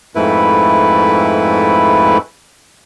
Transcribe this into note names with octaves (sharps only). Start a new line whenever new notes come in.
F2 G#2 A3 E4 B4